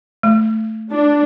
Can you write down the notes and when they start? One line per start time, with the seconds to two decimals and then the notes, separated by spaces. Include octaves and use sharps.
0.23 A3
0.91 D4